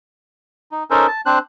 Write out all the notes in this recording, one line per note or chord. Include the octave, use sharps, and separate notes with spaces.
D#4
C#4 D#4 A4 A#4 C5
A5
C4 D4 C5 F#6